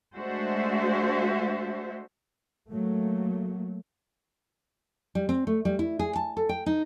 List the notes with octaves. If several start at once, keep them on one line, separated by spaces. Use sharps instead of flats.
G#3 A3 D4 F#4 C5 E5
F#3 A3 A#3
G3
C4
A3
G3
E4
G#4
A5
A4
G5
D#4